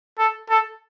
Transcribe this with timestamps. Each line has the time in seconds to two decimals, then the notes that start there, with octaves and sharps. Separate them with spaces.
0.18 A4
0.49 A4